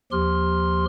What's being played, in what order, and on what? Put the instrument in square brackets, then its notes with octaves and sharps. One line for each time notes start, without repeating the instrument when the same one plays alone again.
[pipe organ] D#2 F3 G4 C6 F6